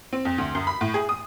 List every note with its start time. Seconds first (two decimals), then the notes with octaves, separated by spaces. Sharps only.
0.13 C4
0.25 F2
0.38 D2
0.55 F#2
0.67 B5
0.81 A2
0.94 G#4
1.09 D#6